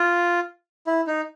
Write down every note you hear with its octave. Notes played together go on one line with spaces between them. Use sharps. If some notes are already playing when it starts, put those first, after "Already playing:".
Already playing: F4
E4
D#4